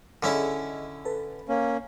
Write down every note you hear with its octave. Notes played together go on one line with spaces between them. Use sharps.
D3 C#4 E4 G#4 A4 D#5
A4 B4
A#3 C#4